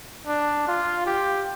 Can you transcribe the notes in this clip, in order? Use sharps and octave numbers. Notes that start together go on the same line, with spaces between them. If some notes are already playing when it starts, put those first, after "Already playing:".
D4
F4
G4